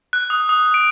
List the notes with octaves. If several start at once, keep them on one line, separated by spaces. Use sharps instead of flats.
F#6
D#6
D#6
D7